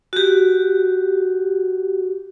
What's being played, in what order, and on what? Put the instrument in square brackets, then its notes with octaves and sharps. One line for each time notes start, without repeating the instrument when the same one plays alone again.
[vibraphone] F#4 G4